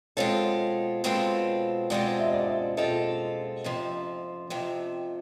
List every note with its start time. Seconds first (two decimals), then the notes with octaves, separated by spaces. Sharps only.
0.17 B2 G#3 C4 F4 A4 C#5
1.04 B2 G#3 C4 F4 A4
1.90 B2 G#3 C4 F4 A4 D5
2.19 E5
2.27 D#5
2.33 D5
2.41 D#5
2.48 E5
2.77 B2 G#3 C4 F4 A4 D#5
3.64 F2 C3 F3
4.50 F2 C3 F3